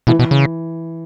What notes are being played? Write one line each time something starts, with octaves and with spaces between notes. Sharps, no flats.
B2 E3
B2
C#3